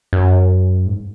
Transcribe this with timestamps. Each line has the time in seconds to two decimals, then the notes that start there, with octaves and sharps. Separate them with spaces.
0.13 F#2
0.87 G#2